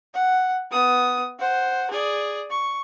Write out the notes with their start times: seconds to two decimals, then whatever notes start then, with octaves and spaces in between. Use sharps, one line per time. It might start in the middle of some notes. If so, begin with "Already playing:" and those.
0.14 F#5
0.71 B3 D#6
1.39 C5 F#5
1.90 G#4 D5
2.50 C#6